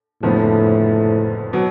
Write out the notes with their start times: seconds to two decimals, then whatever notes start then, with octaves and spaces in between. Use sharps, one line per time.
0.23 F#1 F2 A2 D3 F3 B3
1.53 B2 F#3